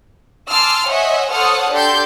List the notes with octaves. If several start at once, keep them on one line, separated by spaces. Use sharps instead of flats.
G#5 A5 C6 D6 E6 F6
C5 C#5 D#5 E5 F#5 G#5
A4 C5 C#5 F#5 D#6 F6
D4 G4 A4 C6 G6